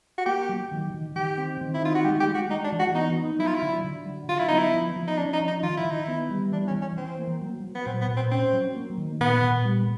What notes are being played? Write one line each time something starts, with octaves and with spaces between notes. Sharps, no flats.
F#4
A#3 G4
F#3
D#3
D#3
D#3 G4
C4
D#3
E4
D#4 F4
F#4
G#3 G4
G4
G#3
F#4
G#3 D#4
D4
E3
F#4
B3 D#4
D#4
F#3 E4
F4
E4
D3
D3
F#3
D3 F4
E4
B3 D#4
E4
F3
F3
D#4
C#4 D4
D#4
F3
D#4
D#3 F4
E4
D#3
D#4
B3 E4
G3
E3 D4
C#4
E3
C#4
E3 C4
A#3
F#3
F#3
B3
A#2 C4
B3
A#2
C4
C4 C#4
F#3
A#3
D#3
A#2 B3
A#2
G3